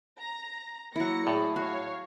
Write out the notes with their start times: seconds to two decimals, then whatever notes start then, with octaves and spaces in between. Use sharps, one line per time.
0.19 A#5
0.96 F#3 A#3 E4 A#6 C#7
1.27 A2 G#4 D5
1.56 F#4 C#5 F5